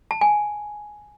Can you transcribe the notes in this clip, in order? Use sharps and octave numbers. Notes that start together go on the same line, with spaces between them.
A5
G#5